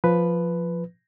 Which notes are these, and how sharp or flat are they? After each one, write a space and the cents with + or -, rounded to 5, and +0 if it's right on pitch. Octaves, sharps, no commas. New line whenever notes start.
F3 +0 B4 +5